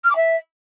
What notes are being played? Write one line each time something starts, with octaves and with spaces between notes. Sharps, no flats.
F6
D6
E5